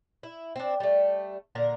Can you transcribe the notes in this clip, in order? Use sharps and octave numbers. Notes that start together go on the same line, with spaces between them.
E4
C4 D4
G3 A3
A#2 D3 A#4